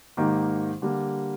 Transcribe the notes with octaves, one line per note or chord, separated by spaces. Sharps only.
G#2 D#3 A#3 D#4 G4
D3 G3 A#3